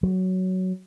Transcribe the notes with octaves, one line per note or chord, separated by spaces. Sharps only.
F#3